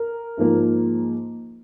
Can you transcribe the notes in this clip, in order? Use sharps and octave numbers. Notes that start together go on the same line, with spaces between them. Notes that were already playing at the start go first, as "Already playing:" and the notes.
Already playing: A#4
G#2 F3 A#3